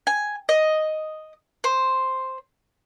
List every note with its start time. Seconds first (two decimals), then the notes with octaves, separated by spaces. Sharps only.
0.07 G#5
0.49 D#5
1.64 C5